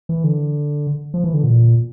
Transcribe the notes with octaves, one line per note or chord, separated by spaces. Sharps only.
E3
D3
F3
E3
D3
A#2